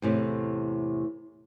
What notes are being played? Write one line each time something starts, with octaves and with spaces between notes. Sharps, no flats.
E2 A2 C3